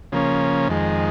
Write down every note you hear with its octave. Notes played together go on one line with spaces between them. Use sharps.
C#3 F3 A#3 C#4
F2 D#3 G#3